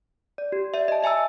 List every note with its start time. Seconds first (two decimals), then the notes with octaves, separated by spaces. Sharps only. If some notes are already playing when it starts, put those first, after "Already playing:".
0.38 D5
0.52 G4
0.74 D5 E5
0.88 D#5 A5
1.03 D#5 E5 G#5 A#5 E6